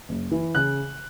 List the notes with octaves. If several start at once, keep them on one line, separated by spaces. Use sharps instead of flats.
F#1
E3
C#3 F#6